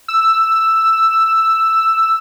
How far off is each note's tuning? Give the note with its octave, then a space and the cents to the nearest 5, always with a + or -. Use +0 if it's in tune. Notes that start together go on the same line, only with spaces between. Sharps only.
E6 +5